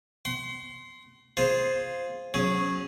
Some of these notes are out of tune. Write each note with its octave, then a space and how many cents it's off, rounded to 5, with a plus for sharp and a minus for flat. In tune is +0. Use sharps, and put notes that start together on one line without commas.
F#5 +45 C6 +0
F4 +0 G#4 +0 C5 +0
F#3 -15 C#4 +0 G#4 +0